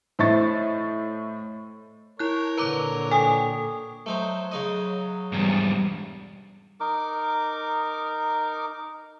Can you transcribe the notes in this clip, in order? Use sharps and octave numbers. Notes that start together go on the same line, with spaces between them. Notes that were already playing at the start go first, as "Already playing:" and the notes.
A2 C5 D#5 E5 C#6 A6
E4 A#4 C#5 F#6
A#2 D3 B4 A#5 D6
A4 G5 G#5 D#6
F#3 A3 D#4 C5
C#3 D#4 D#5
E2 G#2 G3
D#4 A#4 D6